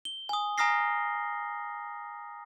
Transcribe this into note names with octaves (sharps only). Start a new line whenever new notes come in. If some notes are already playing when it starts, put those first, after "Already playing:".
G7
G#5 D#6
G#5 A#5 D#6 F6 A#6 C7